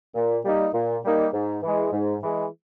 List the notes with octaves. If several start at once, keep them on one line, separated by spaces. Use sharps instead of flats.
A#2
G3 A#3 D#4
A#2
G3 A#3 D#4
G#2
E3 G#3
G#2
E3 G#3